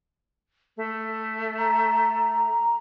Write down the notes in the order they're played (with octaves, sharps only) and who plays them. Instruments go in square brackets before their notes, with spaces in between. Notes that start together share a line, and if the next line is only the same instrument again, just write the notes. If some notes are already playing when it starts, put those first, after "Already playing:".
[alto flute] A3
[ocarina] A#5